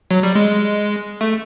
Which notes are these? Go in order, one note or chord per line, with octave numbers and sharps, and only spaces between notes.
F#3
G3
G#3
A3